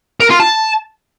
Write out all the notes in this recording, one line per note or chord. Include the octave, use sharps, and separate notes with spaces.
A#4
F4
A5